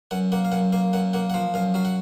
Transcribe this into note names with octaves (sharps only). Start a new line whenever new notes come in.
F#2 F#5
A#3 F#5
F5
F#2 F#5
A#3 F5
F#2 F#5
A#3 F#5
F#5
F3 F5
F#2 F5
F#3 F5
F#5